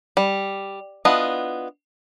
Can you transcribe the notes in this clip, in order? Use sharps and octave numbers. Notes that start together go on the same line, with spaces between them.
G3
B3 D4 E4 F4 D#5